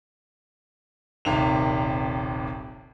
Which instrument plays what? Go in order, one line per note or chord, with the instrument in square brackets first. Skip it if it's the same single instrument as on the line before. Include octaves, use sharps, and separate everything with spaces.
[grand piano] D#1 G#1 C3 D#3 F7